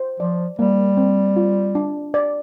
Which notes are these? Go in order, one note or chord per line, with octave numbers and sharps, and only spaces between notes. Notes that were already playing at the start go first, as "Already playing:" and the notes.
Already playing: C5
F3 D5
G3 A#3
C4
F4
D4
D5